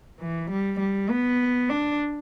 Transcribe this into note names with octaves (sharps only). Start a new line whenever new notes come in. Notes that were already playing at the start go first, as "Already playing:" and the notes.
E3
G3
G3
B3
D4